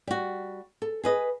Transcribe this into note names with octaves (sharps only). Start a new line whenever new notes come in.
G3 F#4
A4
G#4 B4 D#5